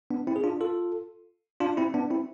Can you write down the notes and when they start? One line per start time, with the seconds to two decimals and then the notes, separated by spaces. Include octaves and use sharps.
0.10 B3 D4
0.27 C4 E4
0.36 G#4
0.44 D4 F4
0.61 F4 A4
1.60 D4 F4
1.77 C4 E4
1.94 B3 D4
2.10 C4 E4